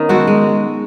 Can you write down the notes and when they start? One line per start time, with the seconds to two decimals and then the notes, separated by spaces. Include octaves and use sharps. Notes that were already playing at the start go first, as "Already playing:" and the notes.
Already playing: D#3 B3 C#4 D#4
0.09 G#3 F#4 A4
0.27 G#3